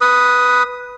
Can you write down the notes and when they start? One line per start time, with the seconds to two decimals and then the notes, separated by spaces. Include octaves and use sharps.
0.01 B4 D#6